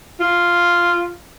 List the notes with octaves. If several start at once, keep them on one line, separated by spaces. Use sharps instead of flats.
F4